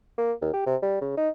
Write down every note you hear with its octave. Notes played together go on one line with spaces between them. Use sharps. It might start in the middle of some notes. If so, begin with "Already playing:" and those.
A#3
D#2
G4
C3
G3
C#3
D#4